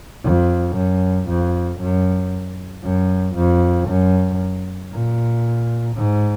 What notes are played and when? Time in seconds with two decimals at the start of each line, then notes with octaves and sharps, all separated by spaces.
0.23 F2
0.76 F#2
1.28 F2
1.79 F#2
2.84 F#2
3.35 F2
3.88 F#2
4.92 A#2
5.96 G#2